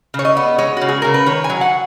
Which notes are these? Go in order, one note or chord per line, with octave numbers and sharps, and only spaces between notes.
C#3 C#5
D#5
B3
G#3 C#5
C#3 F#4
G#4
C#3 A#4
B4
D#3 C#5
G#5
F#3
F#5